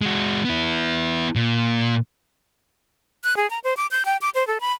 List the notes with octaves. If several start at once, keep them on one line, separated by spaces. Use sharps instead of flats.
G#3 F#4
B3 E4
A#2
F#6
G#4
A#5
C5
D6
G6
G5
D6
C5
A4
B5